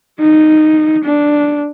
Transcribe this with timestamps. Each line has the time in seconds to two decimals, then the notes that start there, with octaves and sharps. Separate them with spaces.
0.20 D#4
1.05 D4